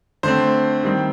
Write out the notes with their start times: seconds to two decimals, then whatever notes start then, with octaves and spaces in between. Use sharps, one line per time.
0.23 D3 A3 C4 C5
0.83 D#3 G3 C4